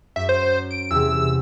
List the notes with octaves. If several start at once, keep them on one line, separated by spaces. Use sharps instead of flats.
F#2 E5
C5
D7
E2 C3 E6